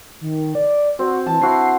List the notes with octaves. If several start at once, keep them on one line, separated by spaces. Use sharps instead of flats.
D#3
D5
C4 F#4
E3 A5
C4 E4 F#4 C7